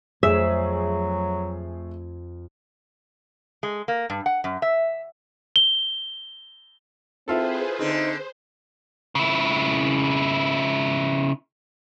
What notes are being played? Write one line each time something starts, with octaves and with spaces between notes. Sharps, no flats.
F2 F#3 A3 G#4 E5
G#3
A#3
G2
F#5
F#2
E5
G7
C4 E4 F4 G#4 A4 B4 C5
D3 C4 D#4 C5
C#3 E4